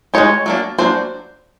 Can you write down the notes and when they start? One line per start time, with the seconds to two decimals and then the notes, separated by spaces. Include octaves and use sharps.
0.14 G#3 C4 D#4 C#5
0.46 F#3 A#3 D4
0.78 F#3 A#3 D4 C5